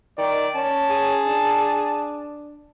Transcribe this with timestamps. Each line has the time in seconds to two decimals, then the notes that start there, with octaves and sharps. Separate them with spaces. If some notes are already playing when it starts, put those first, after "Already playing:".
0.18 D#3 D5
0.55 C#4 A5
0.90 G#4
1.26 D4